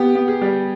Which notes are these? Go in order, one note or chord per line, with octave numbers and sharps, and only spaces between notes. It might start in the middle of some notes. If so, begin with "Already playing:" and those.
Already playing: B3 G4
B3
G#4
G3